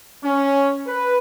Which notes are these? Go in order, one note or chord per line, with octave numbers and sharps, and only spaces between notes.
C#4
B4